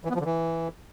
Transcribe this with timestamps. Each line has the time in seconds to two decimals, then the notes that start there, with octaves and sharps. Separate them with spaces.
0.05 E3
0.10 B3
0.15 F3
0.20 D3
0.25 E3